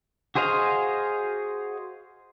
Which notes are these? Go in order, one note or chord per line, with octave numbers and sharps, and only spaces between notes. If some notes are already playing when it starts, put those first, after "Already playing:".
F#4 G#4 C5 D#5 F5